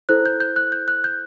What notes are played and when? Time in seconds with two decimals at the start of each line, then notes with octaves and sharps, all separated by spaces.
0.09 E4 A4 C5 F#6
0.26 G6
0.40 G6
0.56 F#6
0.72 G6
0.88 F#6
1.04 G6